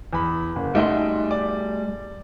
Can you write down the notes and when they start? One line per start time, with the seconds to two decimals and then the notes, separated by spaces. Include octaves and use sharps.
0.13 E2 B5
0.56 F#1
0.75 G3 A3 D#4 E5 F#5 C6
1.31 D5